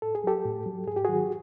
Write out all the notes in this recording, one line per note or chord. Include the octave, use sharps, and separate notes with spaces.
A2 A4
G#4
F#3 G4 A4
A2
F#3
G#2 G#4
G4
D#3 F#3 F#4 G#4